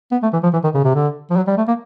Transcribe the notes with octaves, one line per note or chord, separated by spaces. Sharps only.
B3
A3
E3
F3
E3
D#3
C#3
C3
D3
F3
F#3
G3
A3
A#3